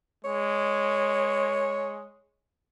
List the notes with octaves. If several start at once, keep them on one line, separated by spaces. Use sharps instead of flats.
G#3 C#5